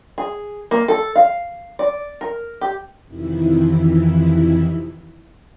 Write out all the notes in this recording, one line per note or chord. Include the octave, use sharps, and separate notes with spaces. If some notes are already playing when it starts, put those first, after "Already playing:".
G#4
A#3
A4
F5
D5
A#4
G4
F2 C3 D#3 E3 E4